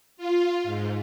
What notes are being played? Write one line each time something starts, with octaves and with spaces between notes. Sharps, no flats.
F4
G#2